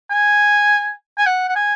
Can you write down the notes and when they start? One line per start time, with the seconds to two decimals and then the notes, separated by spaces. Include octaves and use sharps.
0.10 G#5
1.18 G#5
1.26 F#5
1.49 F#5
1.55 G#5